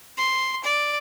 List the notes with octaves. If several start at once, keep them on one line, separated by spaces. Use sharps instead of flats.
C6
D5